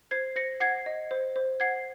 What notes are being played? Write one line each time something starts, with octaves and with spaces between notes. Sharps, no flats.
C5 G#6 C7
C5 A#6 C#7
F#5 G#6 C7
D#5
C5
C5
F#5 G#6 C7